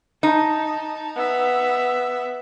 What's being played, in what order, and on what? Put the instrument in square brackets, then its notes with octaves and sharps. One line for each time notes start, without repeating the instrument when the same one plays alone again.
[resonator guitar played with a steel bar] D#4 [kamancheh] A5
[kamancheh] B3 E5